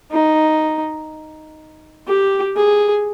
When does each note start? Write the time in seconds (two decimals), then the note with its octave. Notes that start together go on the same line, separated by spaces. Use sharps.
0.12 D#4
2.08 G4
2.57 G#4